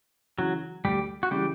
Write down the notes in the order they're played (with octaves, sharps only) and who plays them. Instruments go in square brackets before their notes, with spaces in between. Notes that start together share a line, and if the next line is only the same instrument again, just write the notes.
[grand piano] C#3 E3 [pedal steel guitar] F#3 F#4
[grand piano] D2 [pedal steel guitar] G3 G4
[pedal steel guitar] F#4
[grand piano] C#3 E3 [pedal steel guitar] G3 G4